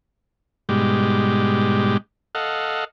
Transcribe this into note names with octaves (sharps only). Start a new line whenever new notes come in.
G#2 B2 G3 G#3 G4
A4 D#5 F5 F#5